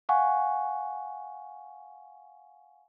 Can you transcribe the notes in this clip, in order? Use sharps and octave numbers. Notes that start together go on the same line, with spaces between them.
F5 F#5 G#5 C#6